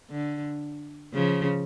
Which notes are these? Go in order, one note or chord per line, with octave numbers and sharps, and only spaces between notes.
D3
C#3 F3